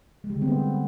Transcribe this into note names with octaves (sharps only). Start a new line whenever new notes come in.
G#3
G3
D3
C4
B3